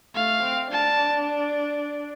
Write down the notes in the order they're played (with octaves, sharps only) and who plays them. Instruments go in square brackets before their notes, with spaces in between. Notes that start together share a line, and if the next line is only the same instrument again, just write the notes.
[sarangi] A3 [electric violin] F5
[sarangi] C4
[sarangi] D4 [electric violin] A5